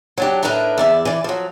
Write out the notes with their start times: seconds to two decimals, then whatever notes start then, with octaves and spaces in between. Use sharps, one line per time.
0.18 F#3 D4 G4
0.43 A2 G#3 D4 D#4 A#4 B4
0.78 E2 D5 E5
1.05 E3 D5
1.24 F3 F#3